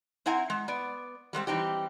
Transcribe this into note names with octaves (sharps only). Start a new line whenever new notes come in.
C4 E4 F#5 G#5 A#5
G#3
B3 D5
G3 G#3 B3 C4
E3 G3 C4 D#4 G4